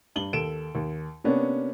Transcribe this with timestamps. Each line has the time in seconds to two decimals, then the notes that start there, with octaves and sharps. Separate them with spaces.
0.16 G2 F#7 G7
0.33 D#2 A4 D7 E7
0.75 D#2
1.24 C3 A#3 B3 C#4 D4